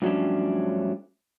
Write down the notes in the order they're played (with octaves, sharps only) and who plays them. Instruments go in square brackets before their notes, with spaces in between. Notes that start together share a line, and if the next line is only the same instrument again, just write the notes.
[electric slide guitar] G2 F3 F#3 A3 C#4 D4